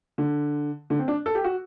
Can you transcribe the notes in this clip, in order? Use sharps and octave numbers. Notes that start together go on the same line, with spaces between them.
D3
D3
C4
D4
A4
G4
F#4